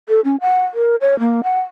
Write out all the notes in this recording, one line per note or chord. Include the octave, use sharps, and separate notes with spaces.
A4
C#4
F#5
A#4
C#5
A#3
F#5